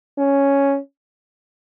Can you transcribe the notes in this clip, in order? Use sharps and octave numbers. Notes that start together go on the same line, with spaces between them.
C#4